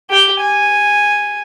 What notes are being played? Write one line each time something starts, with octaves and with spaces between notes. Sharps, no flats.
G4 G5
G#5